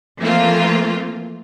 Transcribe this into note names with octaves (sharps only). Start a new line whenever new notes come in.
E3 F3 A3 A#3 C4 F4